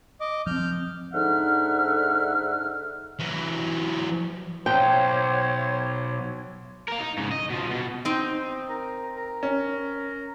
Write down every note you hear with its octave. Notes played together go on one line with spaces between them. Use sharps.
D#5 D6
F3 C4 F6 G6
G#2 D3 D#4 E5 F#5 F6
E3 F#3
B1 C5 C#5 G5
A#4 F5
D#4
G#2 C#3
D#5
B2 F3
B2
C4 D#4
A#4
A#4
C#4